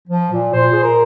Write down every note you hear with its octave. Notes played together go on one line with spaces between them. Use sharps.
F3
A#2
A#2 C5
A#2 G#4
A#4